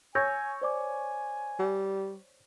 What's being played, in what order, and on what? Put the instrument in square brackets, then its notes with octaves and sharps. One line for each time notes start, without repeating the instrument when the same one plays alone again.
[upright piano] C#5 [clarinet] G#5 [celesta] E6 G6 A#6
[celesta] C5 D5 D6 [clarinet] G#5
[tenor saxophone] G3